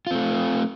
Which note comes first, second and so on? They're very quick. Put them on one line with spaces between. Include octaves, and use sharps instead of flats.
F4 C4 A3